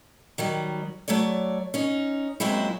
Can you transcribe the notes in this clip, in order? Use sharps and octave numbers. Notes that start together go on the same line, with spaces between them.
D#3 F#3 G3
F#3 A3 C#5 D5
C#4 D#4
F#2 A#2 F#3 G#3 C4 E4